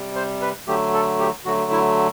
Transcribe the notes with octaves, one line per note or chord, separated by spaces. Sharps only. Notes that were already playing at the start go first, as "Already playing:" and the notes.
Already playing: C3 G3
C5
B4
D3 F#3 A3 G4
A4
G4
D3 F#3 A3 F#4
E4